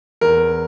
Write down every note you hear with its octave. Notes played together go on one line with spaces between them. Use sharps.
E2 A#4